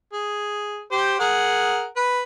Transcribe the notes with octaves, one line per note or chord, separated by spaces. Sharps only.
G#4
G4 C5
G#4 A#4 F#5
B4